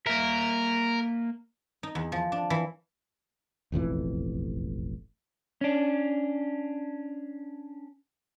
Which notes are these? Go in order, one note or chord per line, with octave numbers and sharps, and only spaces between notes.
A#3 A#4 E5
D#4
E2
F3
D4
E3
E1 A1 F2 E3
C#4 D4